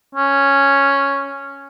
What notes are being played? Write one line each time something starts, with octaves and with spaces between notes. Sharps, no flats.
C#4